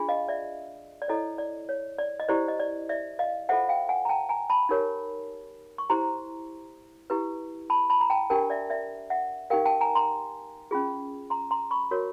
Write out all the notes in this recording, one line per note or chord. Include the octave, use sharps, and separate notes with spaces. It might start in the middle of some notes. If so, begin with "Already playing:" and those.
Already playing: D4 F4 G#4
D#5 F5
D5 E5
D5
E4 A4 C#5 D#5
D5
C#5
D5
D#5
E4 G4 C5 D5
D#5
D5
D5 E5
D#5 F5
F4 A4 C5 E5 F#5
F5 G5
F#5 G#5
A#5
G5 A5
G#5 A#5
A5 B5
D#4 G4 A#4 C#5
C#6
E4 G4 C5 A#5 C6
E4 G4 B4
A5 B5
A5 B5
A#5
G5 A5
D4 G4 A#4 G5 A5
D5 E5
D5 E5
E5 F#5
D#4 G4 A#4 F5 G5
G5 A5
G#5 A#5
A#5 C6
C#4 F4 G#4
A#5 C6
A#5 C6
B5 C#6
F#4 A#4 C#5